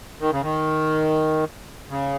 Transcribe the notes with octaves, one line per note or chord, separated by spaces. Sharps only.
D#3
C#3
D#3
C#3